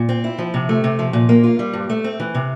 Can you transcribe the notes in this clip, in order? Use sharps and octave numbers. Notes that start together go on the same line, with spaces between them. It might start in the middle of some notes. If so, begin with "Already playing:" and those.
Already playing: A#2
C4
E4
F3
C3
A3
C3
F3
A#2
A#3
F4
G3
G2
A3
C4
E3
C3